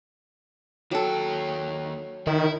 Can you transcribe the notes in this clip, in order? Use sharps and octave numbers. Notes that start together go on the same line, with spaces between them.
D#2 F#3 A4 G5
D#3 E4